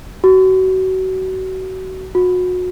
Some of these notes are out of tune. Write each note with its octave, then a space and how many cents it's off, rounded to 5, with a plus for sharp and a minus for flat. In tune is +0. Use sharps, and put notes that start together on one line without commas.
F#4 +30
F#4 -30